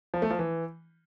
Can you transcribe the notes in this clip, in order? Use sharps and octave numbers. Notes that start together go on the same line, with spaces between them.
F3
A3
F3
E3